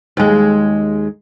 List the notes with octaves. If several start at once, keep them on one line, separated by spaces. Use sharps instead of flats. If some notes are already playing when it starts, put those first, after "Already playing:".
D#2 G#3